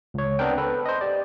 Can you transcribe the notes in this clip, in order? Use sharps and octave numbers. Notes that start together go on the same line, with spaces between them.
C#2 C#5
B3 C4 D4 A#4 G5
A4 B4
C5 D#5
G4 D5